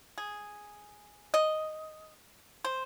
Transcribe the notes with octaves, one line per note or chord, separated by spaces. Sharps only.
G#4
D#5
C5